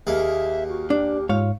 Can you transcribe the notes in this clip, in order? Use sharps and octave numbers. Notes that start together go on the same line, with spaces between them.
D#2 A#3 G#4 E5
F#4
D4 G4
G#2 F4 C#5 F5